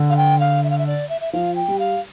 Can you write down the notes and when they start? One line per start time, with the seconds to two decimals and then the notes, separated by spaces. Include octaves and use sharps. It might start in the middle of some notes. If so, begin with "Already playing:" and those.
Already playing: D3
0.10 F5
0.17 G5
0.40 F5
0.64 E5
0.70 F5
0.78 E5
0.87 D5
1.09 E5
1.21 E5
1.33 F3 F5
1.56 G5
1.68 G3
1.79 F5